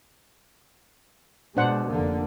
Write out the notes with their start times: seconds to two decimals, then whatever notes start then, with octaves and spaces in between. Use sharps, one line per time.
1.57 B2 G#3 D4 C5 F#5
1.90 F1 D3 A#3